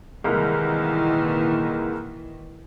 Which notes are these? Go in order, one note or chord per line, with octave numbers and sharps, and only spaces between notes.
C2 A#2 D#3 E3 G#3 A#3